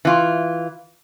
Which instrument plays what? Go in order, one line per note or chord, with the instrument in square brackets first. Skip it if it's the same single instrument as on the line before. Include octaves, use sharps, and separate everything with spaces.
[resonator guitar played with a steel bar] E3 F4